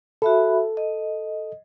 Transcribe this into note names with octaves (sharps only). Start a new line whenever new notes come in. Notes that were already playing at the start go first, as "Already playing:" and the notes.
F#4 A4 E5 B5
D#5